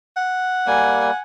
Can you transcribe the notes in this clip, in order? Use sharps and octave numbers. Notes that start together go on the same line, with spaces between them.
F#5
G3 A#3 G#5